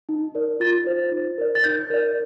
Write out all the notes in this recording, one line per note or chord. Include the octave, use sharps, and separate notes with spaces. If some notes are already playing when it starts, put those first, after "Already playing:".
D#4
A#4 D5
F4 A6
C5
D#4
A#4 D5
A6
D#4 G6
A#4 D5